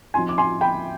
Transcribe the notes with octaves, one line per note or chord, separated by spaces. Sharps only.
F3 C4 D#4 G#5 C6
D6
G#5 C6
G5 B5